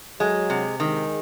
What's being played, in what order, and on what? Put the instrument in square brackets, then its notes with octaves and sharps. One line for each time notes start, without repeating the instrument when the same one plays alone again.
[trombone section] F#3 [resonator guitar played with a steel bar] G#3
[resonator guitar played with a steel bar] C3
[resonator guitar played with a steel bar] D#3 [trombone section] G#3